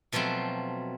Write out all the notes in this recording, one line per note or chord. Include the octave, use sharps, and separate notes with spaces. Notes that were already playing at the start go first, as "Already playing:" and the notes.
B2 F3 F#3 A3 C4